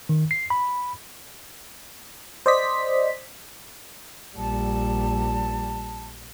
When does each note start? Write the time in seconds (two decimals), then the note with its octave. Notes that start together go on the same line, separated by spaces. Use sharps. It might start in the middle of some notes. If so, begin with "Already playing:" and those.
0.09 D#3
0.31 C7
0.50 B5
2.46 C5 D5 D#5 B6
4.36 A#1 G3 A5